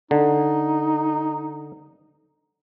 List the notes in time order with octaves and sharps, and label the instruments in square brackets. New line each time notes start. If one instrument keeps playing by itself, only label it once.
[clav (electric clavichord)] D3 [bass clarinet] D#4